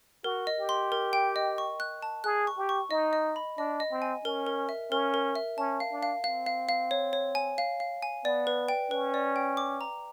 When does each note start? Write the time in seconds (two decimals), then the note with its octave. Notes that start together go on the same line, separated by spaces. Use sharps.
0.24 F#4 A#4
0.47 D#5
0.58 G4
0.69 C6
0.92 A#4
1.13 G5
1.36 D#5
1.58 C#6
1.80 F#6
2.02 A5
2.24 G#4 F#6
2.47 C#6
2.58 G4
2.69 C#6
2.91 D#4 D#5
3.13 D#5
3.36 B5
3.58 D4 D#5
3.80 D#5
3.91 C4
4.02 G#5
4.25 C#4 A#4
4.46 A#4
4.69 E5
4.91 C#4 A#4
5.14 A#4
5.36 E5
5.58 C#4 A5
5.80 F5
5.91 D4
6.03 F5
6.24 C4 F5
6.46 F5
6.69 F5
6.91 C#5
7.13 C#5
7.35 G#5
7.58 F5
7.80 F5
8.03 G#5
8.25 B3 D5
8.47 B4
8.69 G5
8.91 C#4 B4
9.14 D5
9.36 G5
9.57 D6
9.81 A#5